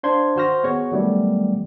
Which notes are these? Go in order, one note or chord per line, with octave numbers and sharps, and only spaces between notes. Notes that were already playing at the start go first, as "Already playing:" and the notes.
D4 C5 F5 C6 G#6
D#3 F#4 C5 F6 A#6
B3 F#4 G#4 C#5
D#3 F#3 G3 A3 B3